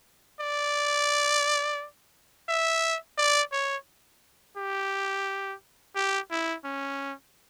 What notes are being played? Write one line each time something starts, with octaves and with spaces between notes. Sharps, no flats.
D5
E5
D5
C#5
G4
G4
E4
C#4